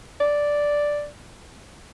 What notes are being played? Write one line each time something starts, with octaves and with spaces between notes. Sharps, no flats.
D5